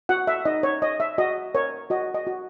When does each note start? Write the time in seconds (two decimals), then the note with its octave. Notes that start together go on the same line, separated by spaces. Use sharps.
0.09 F#4 F#5
0.27 E5
0.45 D#4 D#5
0.63 C#5
0.82 C#5 D#5
1.00 E5
1.18 F#4 D#5
1.55 A#4 C#5
1.90 F#4 D#5
2.14 D#5
2.27 F#4